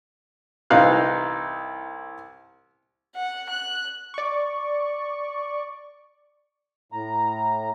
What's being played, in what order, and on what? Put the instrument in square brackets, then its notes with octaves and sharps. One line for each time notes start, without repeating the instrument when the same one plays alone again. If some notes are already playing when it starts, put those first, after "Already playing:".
[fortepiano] C2 E3 D#4 F5 F#6
[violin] F#5
F#6
[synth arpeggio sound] D5 C#6
[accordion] A2 A#5